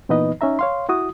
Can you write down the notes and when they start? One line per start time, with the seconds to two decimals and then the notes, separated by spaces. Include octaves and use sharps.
0.09 A#2 E3 B3 D#4 B4 D#5
0.41 C#4 D#4 E5 A#5
0.59 C#5 F5 C6
0.89 E4 F#4 D#6